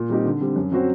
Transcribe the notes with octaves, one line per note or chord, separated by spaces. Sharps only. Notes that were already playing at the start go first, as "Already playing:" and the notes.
Already playing: A#2
G3 C4 D#4 G4
D3
G3 C4
F#2
F#3 C4 F#4 C5